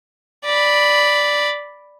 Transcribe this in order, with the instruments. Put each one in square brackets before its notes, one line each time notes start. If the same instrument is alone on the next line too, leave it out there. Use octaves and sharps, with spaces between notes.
[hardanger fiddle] D5 B5